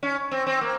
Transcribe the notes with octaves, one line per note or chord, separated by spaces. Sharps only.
C#4
C4
C4
A#3